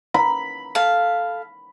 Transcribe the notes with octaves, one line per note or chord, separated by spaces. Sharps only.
B5
A4 F5